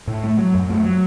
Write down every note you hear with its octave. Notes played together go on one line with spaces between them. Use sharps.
A2
A3
F#3
F#2
A3
F#3